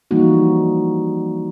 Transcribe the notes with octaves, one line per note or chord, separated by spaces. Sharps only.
E3 F3 G3 A#3 D#4 F#4